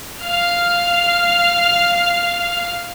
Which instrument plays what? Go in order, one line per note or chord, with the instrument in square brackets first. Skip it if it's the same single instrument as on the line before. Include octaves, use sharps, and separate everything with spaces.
[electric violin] F5 F6